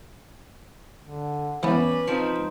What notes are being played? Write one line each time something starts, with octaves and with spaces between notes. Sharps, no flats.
D3
E3 G3 B3 C#4 B4
F3 C4 D#4